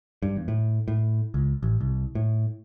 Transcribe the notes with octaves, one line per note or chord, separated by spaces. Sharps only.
G2
E2
A2
A2
C#2
A1
C2
A2